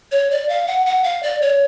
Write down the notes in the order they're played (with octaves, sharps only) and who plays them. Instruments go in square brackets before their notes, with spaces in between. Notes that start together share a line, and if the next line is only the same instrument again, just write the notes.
[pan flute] C#5
D5
F5
F#5
F#5
F5
D5
C#5